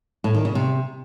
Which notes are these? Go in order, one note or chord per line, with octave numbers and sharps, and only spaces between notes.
A2
D#3
C#3
C3